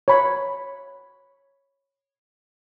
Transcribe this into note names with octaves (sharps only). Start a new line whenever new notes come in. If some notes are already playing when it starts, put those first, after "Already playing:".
C#5 B5